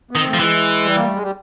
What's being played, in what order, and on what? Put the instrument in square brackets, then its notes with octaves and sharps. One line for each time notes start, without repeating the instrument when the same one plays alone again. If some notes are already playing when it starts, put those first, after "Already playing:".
[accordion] B3
[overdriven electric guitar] D#3 [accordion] C4
[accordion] A3
[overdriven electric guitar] F3
[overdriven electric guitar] E3 [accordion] G#3
[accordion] G3
A#3
A3
G#3
G3